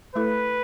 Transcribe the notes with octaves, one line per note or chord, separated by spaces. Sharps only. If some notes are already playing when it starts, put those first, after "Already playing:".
A3 E4 A4 B4